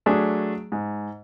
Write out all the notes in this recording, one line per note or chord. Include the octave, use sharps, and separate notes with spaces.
F#3 A3 D4 G#4
G#2